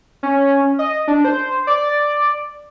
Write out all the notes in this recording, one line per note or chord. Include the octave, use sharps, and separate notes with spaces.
C#4
D#5
D4
C5
D5